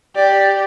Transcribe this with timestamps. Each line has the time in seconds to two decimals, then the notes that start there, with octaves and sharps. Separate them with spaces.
0.16 G4 D5